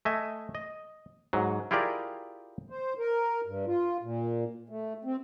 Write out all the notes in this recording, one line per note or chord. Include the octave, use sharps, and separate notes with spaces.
A3 D#5 E5 G#5
D#5
G#2 F#3
E4 F4 G4 G#4 A#4 D5
C5
A#4
G2
F4
A#2
A3
C4